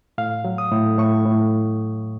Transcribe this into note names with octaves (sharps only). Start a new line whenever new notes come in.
A2 F5
F#3
D#6
A2
A2 C#6
A2